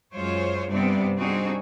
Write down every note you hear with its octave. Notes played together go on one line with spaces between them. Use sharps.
F#2 G#3 F4 C5 C#5
G2 C3 B3 C4 D5
G3 C4 D4 D#4 F#4 G#4